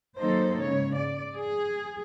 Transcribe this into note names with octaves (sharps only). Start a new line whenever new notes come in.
D#3 F#3 A#3 D#4 A4 C5
G#2 C#3 C#5
D5
G#4